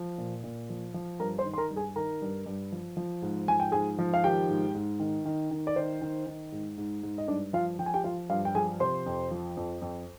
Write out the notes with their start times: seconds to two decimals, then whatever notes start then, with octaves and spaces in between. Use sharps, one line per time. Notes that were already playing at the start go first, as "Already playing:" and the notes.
Already playing: F3
0.18 A#2
0.44 A#2
0.70 F3
0.94 F3
1.20 G2 A#4 A#5
1.38 C5 C6
1.45 D#3
1.54 C6
1.58 A#4 A#5
1.71 G2
1.76 G#4 G#5
1.96 D#3 A#4 A#5
2.22 G2
2.46 G2
2.72 F3
2.97 F3
3.22 G#2
3.48 F3 G#5
3.60 G5
3.72 G#2 G#4 G#5
3.99 F3
4.14 F5
4.24 D#3 G4 G5
4.49 G#2
4.74 G#2
5.00 D#3
5.25 D#3
5.51 D#3
5.67 D5
5.76 D#3 C5
6.02 D#3
6.27 D#3
6.52 G#2
6.78 G#2
7.03 G#2
7.18 D#5
7.28 G2 D4 D5
7.53 F3 F4 F5
7.79 F3 G5
7.86 G#5
7.94 G4 G5
8.04 F3 F4 F5
8.30 G2 F4 F5
8.45 G5
8.55 F3 G#4 G#5
8.80 C3 C5 C6
9.06 F2
9.31 F3
9.57 F2
9.82 F2